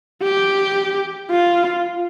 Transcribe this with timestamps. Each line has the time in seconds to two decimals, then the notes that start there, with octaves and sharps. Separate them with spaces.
0.23 G4
1.31 F4